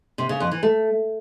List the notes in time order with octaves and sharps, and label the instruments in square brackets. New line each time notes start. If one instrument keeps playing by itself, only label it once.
[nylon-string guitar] C3
C#3
F2
E3
A3